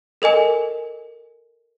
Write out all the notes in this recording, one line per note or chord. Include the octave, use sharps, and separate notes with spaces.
A4 A#4 D#5 G#5